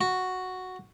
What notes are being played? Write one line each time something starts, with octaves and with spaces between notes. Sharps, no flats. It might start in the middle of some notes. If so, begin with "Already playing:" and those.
F#4